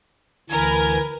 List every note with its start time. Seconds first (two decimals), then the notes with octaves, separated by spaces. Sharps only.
0.50 D2 E3 A#4 B4 G#5